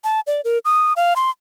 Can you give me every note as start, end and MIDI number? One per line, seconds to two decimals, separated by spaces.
0.04 0.20 81
0.27 0.41 74
0.45 0.58 70
0.65 0.93 87
0.96 1.14 77
1.16 1.30 84